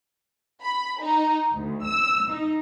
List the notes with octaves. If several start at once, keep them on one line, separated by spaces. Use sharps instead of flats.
B5
D#4
D2
E6
D#4